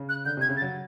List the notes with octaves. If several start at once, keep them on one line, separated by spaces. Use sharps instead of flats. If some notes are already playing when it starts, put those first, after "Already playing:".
Already playing: C#3
F#6
D3 G6
C3 G#6
C#3
A6
F#3